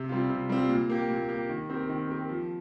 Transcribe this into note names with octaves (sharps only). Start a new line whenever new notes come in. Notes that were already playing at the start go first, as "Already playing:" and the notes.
Already playing: C3
G3 C4 F4
C3
G3 C4 F4
A#2
A#3 G4
A#2
A#3 G4
D#3
C4 G4 A#4
D#3
C4 G4 A#4
F3